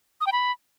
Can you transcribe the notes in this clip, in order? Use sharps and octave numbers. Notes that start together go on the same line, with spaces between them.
D#6
G5
B5